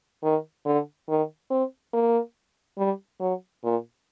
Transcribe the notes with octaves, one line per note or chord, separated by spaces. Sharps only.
D#3
D3
D#3
C4
A#3
G3
F#3
A#2